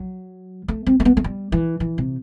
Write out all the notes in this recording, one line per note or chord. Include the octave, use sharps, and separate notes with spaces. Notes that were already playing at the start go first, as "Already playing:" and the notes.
Already playing: F#3
A3
C4
A3
B3
A3
G3
E3
E3
C3